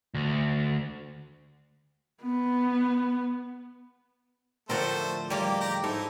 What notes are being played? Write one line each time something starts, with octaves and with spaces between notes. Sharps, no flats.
D2
B3
A2 D3 F3 A3 A#4 C5 D5 F#5
G3 G#3 A#3 F4 G4
G4 G5 A#5
G#2 D#4 E4 A4